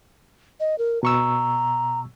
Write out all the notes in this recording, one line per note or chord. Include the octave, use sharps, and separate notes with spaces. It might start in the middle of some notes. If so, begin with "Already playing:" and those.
D#5
A#4
B2 A#5 C#6 E6